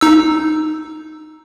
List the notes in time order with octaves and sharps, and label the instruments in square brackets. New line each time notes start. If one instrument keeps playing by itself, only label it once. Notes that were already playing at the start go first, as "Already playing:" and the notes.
[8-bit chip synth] D#4 E6